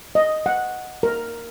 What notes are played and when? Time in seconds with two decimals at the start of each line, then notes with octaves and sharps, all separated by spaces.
0.15 D#5
0.46 F#5
1.03 A#4